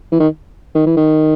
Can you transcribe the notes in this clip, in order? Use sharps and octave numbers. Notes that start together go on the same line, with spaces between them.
E3
D#3
D#3
E3
D#3